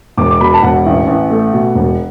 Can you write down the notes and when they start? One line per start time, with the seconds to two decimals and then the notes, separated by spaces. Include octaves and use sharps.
0.17 E1 D6
0.31 D6
0.41 B2 B5
0.54 A5
0.62 E1 F#5
0.86 A1
1.07 A1
1.30 A3
1.53 B2
1.75 E1